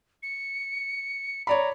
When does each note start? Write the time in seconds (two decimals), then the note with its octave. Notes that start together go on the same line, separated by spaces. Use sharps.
0.23 C#7
1.47 C#5 D5 A#5 B5